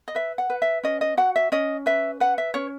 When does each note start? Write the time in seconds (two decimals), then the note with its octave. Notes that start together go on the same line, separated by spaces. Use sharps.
0.08 D#5
0.15 B4 E5
0.38 F#5
0.50 B4
0.62 E5
0.83 C#4 D#5
1.01 D#5
1.17 F#4 F#5
1.36 E5
1.52 C#4 D#5
1.86 B4 E5
2.20 B4 F#5
2.38 E5
2.54 C#4 C#5